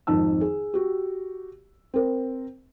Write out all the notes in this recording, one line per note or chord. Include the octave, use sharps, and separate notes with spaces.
G#1 F2 D#3 D#4 A5 E6
G#4
F#4 G4
C4 A#4